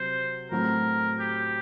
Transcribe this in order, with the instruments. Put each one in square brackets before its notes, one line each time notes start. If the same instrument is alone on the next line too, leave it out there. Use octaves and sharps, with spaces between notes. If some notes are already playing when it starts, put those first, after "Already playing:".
Already playing: [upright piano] C3 F#3 C4 [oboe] C5
[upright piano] A2 F#3 A3 C4 F#4 [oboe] A#4
[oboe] G4